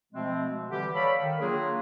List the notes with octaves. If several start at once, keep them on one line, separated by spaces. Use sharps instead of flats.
B2 F3 G#3 A3 C4
D3 E3 G3 G4
A4 C#5 D5 F5 B5
D#3
F#3 A#3 D4 F4 G#4